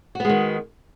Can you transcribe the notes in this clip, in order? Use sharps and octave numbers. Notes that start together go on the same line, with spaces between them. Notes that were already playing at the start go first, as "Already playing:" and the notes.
D#3 G#3 B3 F#4